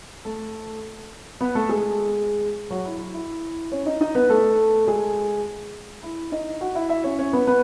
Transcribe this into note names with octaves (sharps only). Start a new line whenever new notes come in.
A3 A4
B3 B4
A3 A4
G#3 G#4
F#3 F#4
E4
E4
E4
C#4 C#5
D#4 D#5
D#4 D#5
B3 B4
A3 A4
G#3 G#4
E4
D#4 D#5
F#4 F#5
E4 E5
E4 E5
C#4 C#5
C#4 C#5
B3 B4
B3 B4